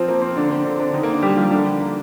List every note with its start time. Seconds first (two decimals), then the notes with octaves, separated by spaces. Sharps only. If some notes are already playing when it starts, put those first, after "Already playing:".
Already playing: F3 C4 F4
0.08 A#3
0.22 C4
0.36 D3 D4
0.51 C4
0.65 D3 D4
0.79 D3 D4
0.93 D#3 D#4
1.03 A#3
1.12 D3 D4
1.22 G3 G4
1.37 F3 F4
1.51 D3 D4
1.80 A#3